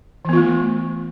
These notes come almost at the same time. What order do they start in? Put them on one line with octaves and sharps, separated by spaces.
E3 B3 F4 A3